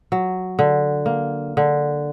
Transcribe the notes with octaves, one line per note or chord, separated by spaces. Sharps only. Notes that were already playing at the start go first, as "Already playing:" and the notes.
F#3
D3
A#3
D3